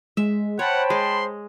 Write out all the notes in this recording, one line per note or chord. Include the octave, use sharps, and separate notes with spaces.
G#3 E5
C5 C#5 F#5 G5 A5 B5
G#3 C6